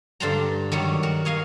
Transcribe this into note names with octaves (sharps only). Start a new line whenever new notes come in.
G2 D3 D4 C5 G5 A#5
D#3 F#3 G3 F#5
F#4 A#4
C#5 D#5 F5 G#5